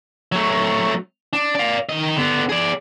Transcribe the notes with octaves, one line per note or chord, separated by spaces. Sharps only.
F#3 A3
D4
D5 F5
D#3 D#5
D3 B3
G#4 D5